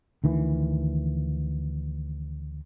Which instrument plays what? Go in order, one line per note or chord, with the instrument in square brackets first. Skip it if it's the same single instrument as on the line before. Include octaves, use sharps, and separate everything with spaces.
[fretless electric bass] D2 D#3 E3